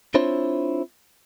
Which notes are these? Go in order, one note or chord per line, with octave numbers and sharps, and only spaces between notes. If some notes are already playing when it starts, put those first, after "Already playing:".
C4 D4 E4 F4 C5 C#5